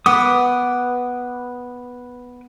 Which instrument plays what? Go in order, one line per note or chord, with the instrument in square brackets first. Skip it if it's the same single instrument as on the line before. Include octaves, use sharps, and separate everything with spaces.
[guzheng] B3 [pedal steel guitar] B4 D6 D#6